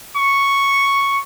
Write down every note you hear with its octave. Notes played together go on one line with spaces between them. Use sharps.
C#6